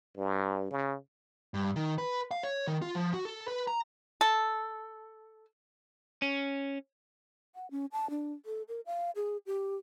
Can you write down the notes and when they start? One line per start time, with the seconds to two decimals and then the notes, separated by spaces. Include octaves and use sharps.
0.17 G2
0.71 C#3
1.54 G2
1.76 D#3
1.98 B4
2.31 F5
2.43 C#5
2.67 D#3
2.82 F4
2.95 F3
3.14 F#4
3.25 A4
3.48 B4
3.67 A#5
4.21 A4
6.22 C#4
7.55 F#5
7.71 C#4
7.92 A5
8.10 D4
8.46 A4
8.68 A#4
8.86 F5
9.16 G#4
9.46 G4